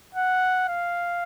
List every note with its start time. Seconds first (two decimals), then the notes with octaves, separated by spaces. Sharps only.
0.15 F#5
0.68 F5